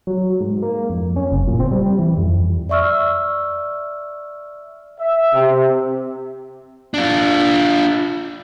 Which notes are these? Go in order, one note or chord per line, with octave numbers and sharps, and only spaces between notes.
F#3
G#2
A#3
F2
C#4
F#1
A#2
C4
G3
G3
E3
F2
D5 E5 C#6 E6 F6
E5
C3
D4 F4